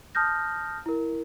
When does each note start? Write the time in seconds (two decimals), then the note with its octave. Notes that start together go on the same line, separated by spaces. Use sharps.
0.15 A5 D#6 F6 G6 A#6
0.86 E4 A#4